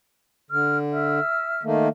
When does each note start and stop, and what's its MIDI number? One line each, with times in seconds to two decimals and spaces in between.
0.51 1.20 50
0.51 0.78 89
0.93 1.63 76
0.93 1.63 89
1.63 1.89 51
1.63 1.89 57
1.63 1.89 58